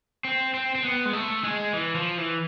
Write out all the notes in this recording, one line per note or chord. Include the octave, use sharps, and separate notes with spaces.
C4
C4
C4
B3
G#3
A3
G#3
E3
F3
E3